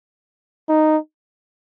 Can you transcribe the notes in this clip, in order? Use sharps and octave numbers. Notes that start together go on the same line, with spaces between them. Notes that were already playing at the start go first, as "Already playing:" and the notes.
D#4